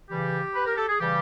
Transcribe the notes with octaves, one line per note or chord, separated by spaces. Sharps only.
C#3 E3 G3 G4
B4
A#4
A4
G#4
C#3 E3 G3 G4